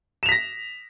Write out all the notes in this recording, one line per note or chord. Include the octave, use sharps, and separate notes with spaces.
A#6 B6 E7 F7